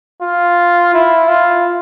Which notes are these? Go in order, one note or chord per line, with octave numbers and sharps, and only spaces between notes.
F4
E4
F4